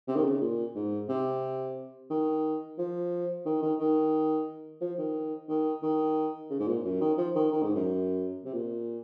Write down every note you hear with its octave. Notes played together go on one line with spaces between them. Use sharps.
C3
D#3
C#3
A#2
G#2
C3
D#3
F3
D#3
D#3
D#3
F3
D#3
D#3
D#3
C#3
G#2
A#2
F#2
D#3
F3
D#3
D#3
G#2
F#2
C3
A#2